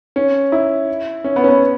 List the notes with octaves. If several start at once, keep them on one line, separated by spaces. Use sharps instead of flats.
C#4
E4
C#4
B3
C#4
B3